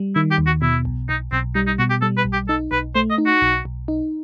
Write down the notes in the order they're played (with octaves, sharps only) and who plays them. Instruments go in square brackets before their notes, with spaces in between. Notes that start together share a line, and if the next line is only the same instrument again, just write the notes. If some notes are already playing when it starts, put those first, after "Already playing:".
Already playing: [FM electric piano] G3
[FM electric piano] D#3 [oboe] E4
[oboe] G4
[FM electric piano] D#2
[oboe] F#4
[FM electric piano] B2 [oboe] E4
[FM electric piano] B1
[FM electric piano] B1 [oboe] D#4
[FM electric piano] B1 [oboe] C4
[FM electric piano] G3 [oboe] D#4
[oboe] D#4
[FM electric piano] B2 [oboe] F#4
[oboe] G4
[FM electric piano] G3 [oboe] A4
[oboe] B4
[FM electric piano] B1
[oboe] G4
[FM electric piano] D#4 [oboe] A4
[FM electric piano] B1 [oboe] B4
[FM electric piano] A3 [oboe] C5
[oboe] D#5
[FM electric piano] D#4
[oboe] F#4
[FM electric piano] B1
B1
D#4